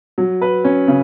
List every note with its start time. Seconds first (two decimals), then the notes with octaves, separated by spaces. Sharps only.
0.18 F#3
0.42 B4
0.65 C#4
0.88 C#3